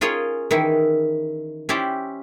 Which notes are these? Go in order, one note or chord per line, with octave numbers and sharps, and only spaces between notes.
C#4 F4 G#4 A#4 C#5 D#5
D#3 E3 E4
C#4 E4 G4 C5 D5